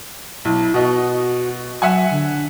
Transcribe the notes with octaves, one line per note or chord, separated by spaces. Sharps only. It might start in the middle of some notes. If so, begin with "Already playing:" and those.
B1 E4
B2 F#4 D#5
F#3 E5 F#5 G#5
D3